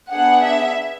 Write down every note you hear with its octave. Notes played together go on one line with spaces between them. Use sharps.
B3 D4 G#4 F#5
E5